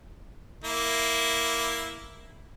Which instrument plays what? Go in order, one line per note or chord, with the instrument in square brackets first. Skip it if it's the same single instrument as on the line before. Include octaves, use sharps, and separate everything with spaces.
[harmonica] A#3 E4